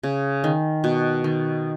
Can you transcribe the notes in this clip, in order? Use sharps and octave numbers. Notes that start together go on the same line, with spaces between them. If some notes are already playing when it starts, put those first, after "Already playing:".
C#3
D#3
B2
D#3